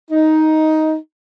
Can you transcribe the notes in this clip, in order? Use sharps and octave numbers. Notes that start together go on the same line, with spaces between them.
D#4